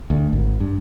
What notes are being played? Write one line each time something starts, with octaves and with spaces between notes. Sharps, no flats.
D2
G#1
G2